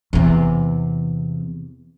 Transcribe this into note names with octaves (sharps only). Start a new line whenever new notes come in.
E2 C3